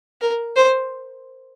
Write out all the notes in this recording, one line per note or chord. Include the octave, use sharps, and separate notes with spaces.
A#4
C5